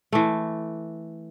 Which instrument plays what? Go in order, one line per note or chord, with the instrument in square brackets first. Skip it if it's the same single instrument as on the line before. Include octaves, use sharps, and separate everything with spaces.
[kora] E3 A3